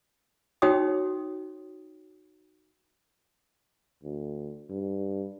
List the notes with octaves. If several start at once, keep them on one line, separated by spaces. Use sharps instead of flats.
D#4 F#4 C#5 G5 D#6
D2
G2